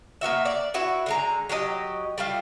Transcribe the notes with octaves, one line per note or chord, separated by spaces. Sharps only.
A#3 B3 F#4 E5
D5
E4 F#4 B4
D3 G#3 A#5
F#3 G4 A4 D#5
G3 A3 F4